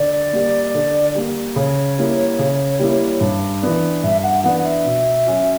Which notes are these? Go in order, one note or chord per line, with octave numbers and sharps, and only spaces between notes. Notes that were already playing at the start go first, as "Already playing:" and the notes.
Already playing: D3 D5
G3 A#3
D3
G3 A#3
C#3 C#5
G3 A#3 E4
C#3
G3 A#3 E4
G2
E3 B3 D4
G2 E5
F#5
E3 B3 D4 F#5
E5
B2
F#3 C#4 F#4